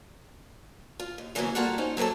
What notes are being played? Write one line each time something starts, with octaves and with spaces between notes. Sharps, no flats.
F4
D#2
C#3 E3 F#3 A#3 B3 C#4
G3 A#3 F4 F#4 A4 F#5
C#4 D#4 F4 C5
F#3 A#3 B3 C#4 A4